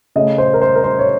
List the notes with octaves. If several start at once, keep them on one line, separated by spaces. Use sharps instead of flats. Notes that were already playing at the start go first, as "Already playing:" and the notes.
C#3 A3 D#5
C5
A#4
C5
A#4
C5
C#5